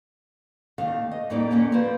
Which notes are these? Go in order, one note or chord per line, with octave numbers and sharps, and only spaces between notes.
D#2 D#3 A3 F5
D#5
F2 A2 G3 A#3 D#4 D5
D#3 A3 A#3 C#4 C#5
F3 F4 B4 C5 D5